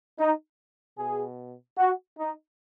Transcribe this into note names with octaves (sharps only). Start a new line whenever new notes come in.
D#4
B2 G#4
F#4
D#4